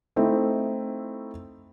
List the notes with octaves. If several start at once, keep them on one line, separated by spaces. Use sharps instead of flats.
A3 C4 D#4 E4